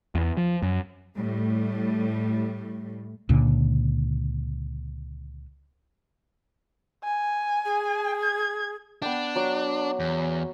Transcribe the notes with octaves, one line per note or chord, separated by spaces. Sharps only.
E2
F3
F#2
A2 G3
C#2 A#2 D3
G#5
G#4
G#6
B3 D4 G5
F#3 D6
E2